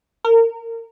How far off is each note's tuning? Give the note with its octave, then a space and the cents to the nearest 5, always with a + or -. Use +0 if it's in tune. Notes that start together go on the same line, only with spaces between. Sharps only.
A#4 -30